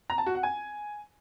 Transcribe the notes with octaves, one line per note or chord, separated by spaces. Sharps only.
A#5
A5
F#4
F#5
G#5